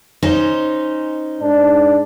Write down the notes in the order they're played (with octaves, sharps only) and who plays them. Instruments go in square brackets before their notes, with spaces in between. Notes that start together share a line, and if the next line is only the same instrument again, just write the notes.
[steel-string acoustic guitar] C#4 D#4 C5
[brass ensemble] G#2 D4